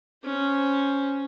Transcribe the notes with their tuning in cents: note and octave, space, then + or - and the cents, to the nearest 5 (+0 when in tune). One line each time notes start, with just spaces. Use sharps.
C#4 +0 C5 +0